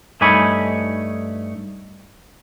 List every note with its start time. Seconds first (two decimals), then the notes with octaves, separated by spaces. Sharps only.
0.21 G2 A3 D#4 C#5 G#5 B5